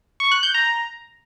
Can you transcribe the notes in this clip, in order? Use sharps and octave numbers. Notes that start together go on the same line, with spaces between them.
C#6
F#6
G6
A#5